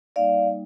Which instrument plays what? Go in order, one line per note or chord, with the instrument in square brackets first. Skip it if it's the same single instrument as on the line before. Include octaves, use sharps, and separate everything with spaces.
[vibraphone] G3 A#3 D#4 D5 F5